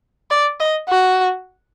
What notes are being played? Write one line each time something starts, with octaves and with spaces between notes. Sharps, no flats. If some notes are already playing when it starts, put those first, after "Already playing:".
D5
D#5
F#4